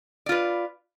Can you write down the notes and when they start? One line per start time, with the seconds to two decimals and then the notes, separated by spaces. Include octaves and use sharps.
0.26 D5
0.29 F4
0.32 B4